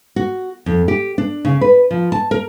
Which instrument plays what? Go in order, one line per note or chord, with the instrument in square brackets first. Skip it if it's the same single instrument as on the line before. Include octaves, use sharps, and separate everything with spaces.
[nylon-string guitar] F#4
F2
G4
D4
C#3
B4
F3
A5
A#4